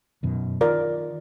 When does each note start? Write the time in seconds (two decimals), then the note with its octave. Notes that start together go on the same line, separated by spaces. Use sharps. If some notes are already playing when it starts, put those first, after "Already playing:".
0.23 F#2 B2 D#3
0.61 D#3 F4 A#4 D5